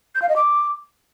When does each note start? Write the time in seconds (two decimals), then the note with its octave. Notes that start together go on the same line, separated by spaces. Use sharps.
0.15 G6
0.22 F5
0.29 D#5
0.36 D6